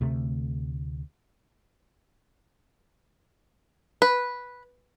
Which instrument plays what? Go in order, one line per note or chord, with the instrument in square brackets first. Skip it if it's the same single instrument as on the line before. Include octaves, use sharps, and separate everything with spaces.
[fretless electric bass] D2 C3 A3
[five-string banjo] B4